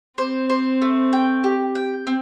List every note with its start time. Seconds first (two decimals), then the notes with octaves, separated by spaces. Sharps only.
0.18 C4 C5
0.50 C5
0.82 A3
1.13 G5
1.44 G4
1.75 G5
2.07 C4